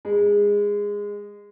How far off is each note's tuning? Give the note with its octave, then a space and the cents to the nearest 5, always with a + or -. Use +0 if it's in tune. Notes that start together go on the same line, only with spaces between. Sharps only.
G#3 -20